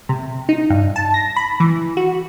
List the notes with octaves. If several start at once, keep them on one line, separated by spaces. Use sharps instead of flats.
C3
D#4
G2
A5
A#6
B5
E3
F#4